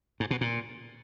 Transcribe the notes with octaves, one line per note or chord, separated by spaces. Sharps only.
G#2
B2
A#2